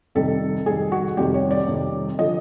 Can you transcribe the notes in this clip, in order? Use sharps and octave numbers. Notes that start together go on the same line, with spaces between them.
F2 C3 D#3 G3 A4
F2 C3 D#3 G3 G#4
F#4
F2 C3 D#3 G3 G4
C#5
D5
F2 C3 D#3 G3
D3 F3 D#5